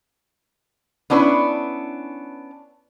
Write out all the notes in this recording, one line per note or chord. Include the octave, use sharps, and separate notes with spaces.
B3 C#4 D4 E4 B4